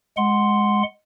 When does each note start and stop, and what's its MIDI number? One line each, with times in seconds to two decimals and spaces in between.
0.17 0.83 56
0.17 0.83 78
0.17 0.83 84